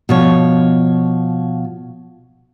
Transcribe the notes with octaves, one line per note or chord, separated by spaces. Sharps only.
B2 F3 C#5